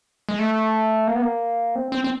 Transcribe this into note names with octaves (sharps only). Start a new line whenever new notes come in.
G#3
A3
A#3
B3
A#3
C4
C4
C4